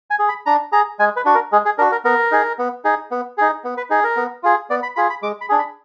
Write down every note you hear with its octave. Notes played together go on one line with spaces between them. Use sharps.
G#5
G#4
B5
D4 A#5
G#4 A#5
G#3 G#5
B4
D4 F#4
A#4
G#3 G#4
G#4
D4 F#4 A#4
A#4
B3 A#4
D#4 G#4
B3
D#4 G#4
B3
D#4 G#4
B3
B4
D#4 G#4
A#4
B3
F4 G#4
B3 D5
B5
F4 G#4 B5
B5
G#3 D6
B5
D4 G#4
B5